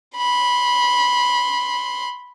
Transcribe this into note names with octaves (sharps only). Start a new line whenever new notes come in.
B5 C6